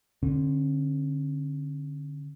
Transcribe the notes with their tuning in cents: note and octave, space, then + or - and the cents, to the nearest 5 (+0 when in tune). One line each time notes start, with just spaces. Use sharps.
D3 +0 C#4 -45